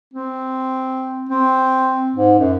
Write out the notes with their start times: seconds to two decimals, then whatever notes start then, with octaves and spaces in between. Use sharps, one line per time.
0.14 C4
1.29 C4
2.16 G#2
2.39 F#2